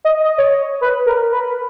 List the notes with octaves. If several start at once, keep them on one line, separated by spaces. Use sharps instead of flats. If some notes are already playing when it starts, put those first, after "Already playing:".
D#5
D#5
C#5
B4
A#4
B4